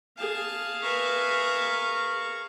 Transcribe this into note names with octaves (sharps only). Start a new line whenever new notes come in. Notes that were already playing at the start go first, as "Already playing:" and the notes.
G#4 F5 A5
A#4 B4 E5 C#6